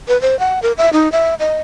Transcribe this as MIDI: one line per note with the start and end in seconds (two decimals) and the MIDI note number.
0.08 0.19 71
0.21 0.38 72
0.39 0.59 78
0.62 0.72 70
0.78 0.90 76
0.93 1.11 63
1.12 1.34 76
1.39 1.61 75